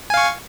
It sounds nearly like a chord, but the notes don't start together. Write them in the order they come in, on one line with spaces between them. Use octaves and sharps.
G#5 F5 C#6